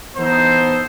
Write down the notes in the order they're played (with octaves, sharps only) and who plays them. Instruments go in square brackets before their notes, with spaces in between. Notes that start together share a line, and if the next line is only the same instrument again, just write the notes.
[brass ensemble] E3 B3 D#4 A4 C5